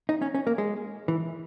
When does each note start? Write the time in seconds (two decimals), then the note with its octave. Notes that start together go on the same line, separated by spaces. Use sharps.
0.09 D#4
0.22 C#4
0.35 C#4
0.47 A#3
0.58 G#3
1.08 E3